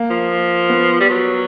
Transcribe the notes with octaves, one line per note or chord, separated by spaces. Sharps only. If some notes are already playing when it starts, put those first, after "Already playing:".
Already playing: A#3
F3
B3
G3
F#3